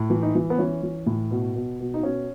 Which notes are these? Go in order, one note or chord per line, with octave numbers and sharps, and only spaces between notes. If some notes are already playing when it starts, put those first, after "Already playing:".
Already playing: A2
E3
D#4
E3
B3
E3 C#4
E3
A2
B2
B2
B2
D#4
B2 C#4